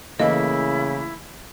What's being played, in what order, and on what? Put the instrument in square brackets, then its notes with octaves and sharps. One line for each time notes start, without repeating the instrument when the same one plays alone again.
[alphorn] C#3 [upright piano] E3 A3 A#3 [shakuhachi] E4 [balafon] D#5